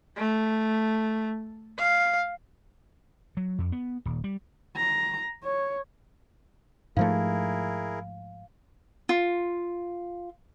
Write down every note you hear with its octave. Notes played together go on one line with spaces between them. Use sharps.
A3
F5
F#3
F2
B3
D#1
G3
A#5
C#5
G#2 F3 A3 E4 G#4 A#4 F5
F4